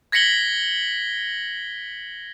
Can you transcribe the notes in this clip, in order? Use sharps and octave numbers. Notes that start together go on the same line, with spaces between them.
G#6 A#6 B6 C#7 F#7 G7